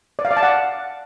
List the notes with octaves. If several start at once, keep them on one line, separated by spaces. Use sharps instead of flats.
D5
F5
D5
A5
F#5